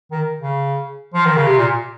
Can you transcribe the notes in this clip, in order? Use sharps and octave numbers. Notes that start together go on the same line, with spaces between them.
D#3
C#3
F3
D#3
C#3
C3
A#2